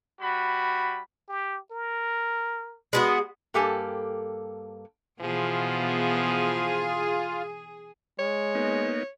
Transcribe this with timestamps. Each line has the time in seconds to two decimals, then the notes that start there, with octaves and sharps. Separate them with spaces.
0.21 G3 F#4 B5
1.29 G4
1.72 A#4
2.93 G#3 B3 F#4
3.54 G2 A#3 G4 A4 G#5 A5
5.21 B2 E3 F3 B3 F4 G#4
8.19 G#3 C#5
8.55 A#3 B3 D#4